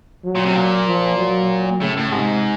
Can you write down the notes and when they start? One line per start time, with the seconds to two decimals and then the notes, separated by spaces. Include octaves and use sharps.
0.25 F#3
0.35 A#2
0.45 C3
0.56 A#2
0.88 F3
1.18 F#3
1.81 A2 C#3
1.97 A2
2.12 G#2 C3